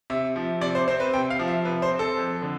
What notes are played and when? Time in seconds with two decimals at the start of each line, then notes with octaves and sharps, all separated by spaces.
0.10 C3 E5
0.36 F3
0.61 C3 D5
0.75 C5
0.88 C4 C5
1.00 B4
1.13 C3 G5
1.30 F5
1.39 F3
1.48 E5
1.65 C3 B4
1.82 C5
1.91 C4
1.99 A4
2.17 F2
2.42 D3